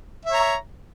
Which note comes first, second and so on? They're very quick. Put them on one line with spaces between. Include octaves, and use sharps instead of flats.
E5 C#5 A#5